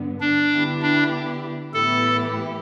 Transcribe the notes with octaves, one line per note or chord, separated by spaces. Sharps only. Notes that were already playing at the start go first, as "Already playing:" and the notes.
Already playing: G2 D3 B3
D4
D3 B3 E4 G4
D4
A2 E3 B3 E4 G4 A4